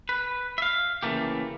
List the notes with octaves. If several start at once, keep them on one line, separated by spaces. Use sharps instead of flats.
B4
E5 F5
C#3 E3 A3 A#3 G4